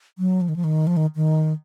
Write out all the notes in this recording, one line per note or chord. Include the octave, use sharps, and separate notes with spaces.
F#3
F3
D#3
F3
D#3
F3
D#3
D#3